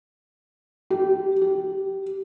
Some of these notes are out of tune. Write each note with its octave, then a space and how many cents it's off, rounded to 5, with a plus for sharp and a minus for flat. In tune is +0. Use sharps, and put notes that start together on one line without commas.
G4 -20
G4 -15